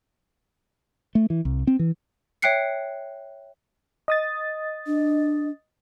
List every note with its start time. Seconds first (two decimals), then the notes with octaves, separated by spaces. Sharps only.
1.15 A3
1.30 E3
1.45 C2
1.67 C4
1.79 E3
2.42 C#5 E5 G5 F#6 C7 C#7
4.08 D#5 D#6 A6
4.87 D4